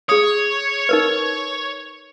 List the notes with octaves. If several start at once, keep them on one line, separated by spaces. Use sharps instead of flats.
G#4 C#5 D#6
D#4 A#4 B4